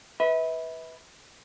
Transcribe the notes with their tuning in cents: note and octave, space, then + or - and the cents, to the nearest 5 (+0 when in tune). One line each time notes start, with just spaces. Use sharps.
B4 +0 E5 -35